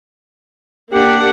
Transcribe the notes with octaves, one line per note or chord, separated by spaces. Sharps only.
A#3 D4 G4 F#5